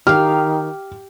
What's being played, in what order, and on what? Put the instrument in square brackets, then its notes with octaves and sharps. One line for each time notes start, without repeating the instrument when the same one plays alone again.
[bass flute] D#3 [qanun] G4 F5 [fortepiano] F6